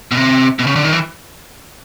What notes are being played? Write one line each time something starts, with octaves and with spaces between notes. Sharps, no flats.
B2
C3
B2
C#3
D3
D#3
E3